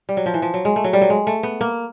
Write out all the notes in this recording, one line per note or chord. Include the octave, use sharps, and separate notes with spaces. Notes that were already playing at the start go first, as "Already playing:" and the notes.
G3
F#3
F3
E3
F3
F#3
G#3
A3
F#3
G3
F#3
G#3
A3
B3
A#3